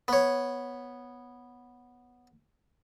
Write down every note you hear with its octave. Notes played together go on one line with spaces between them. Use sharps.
B3 C#5